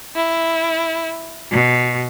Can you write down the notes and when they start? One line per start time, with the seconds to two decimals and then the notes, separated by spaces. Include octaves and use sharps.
0.16 E4
1.52 B2